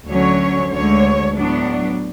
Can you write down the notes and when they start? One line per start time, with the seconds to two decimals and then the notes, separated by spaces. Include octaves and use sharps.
0.09 D2 D3 F#3 C#4 C#5
0.72 D2 D3 G#3 C#5
1.34 A2 F#3 B3 D4